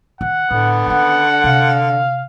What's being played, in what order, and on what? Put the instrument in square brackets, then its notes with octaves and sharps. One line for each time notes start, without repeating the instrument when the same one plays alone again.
[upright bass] D#3 [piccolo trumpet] F#5
[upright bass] A2 [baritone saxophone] D3 [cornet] B3
[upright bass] D#3 C#4 [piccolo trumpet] F#5
[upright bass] C3 [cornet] F5